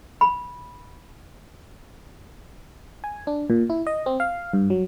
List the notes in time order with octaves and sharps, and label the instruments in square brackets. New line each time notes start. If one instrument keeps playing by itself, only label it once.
[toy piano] B5
[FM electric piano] G#5
D4
A#2
E4
D#5
C4
F5
G2
F#3